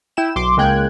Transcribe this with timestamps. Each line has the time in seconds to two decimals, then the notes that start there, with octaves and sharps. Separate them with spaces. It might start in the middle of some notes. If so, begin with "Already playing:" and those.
0.17 E4 G5 E7
0.36 B1 C6 D6
0.57 C#2 G#3 A#3 G5 F#6 G#6